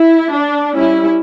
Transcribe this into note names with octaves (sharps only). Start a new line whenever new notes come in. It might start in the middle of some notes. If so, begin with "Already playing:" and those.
Already playing: E4
D4
G3 C#4 E4